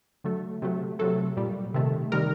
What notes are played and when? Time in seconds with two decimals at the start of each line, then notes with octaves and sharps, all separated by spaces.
0.24 D3 F#3 A3
0.62 C3 F#3 A3
0.99 C3 F#3 A3 A4
1.37 A#2 G3
1.74 C3 D#3 A3
2.12 C3 D#3 G3 A#4